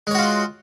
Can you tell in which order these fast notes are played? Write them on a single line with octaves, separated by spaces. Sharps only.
G#3 C#5 F#4 F4